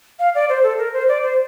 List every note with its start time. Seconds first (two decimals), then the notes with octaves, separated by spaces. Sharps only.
0.19 F5
0.35 D5
0.49 C5
0.63 A4
0.78 A#4
0.93 C5
1.08 D5
1.23 C5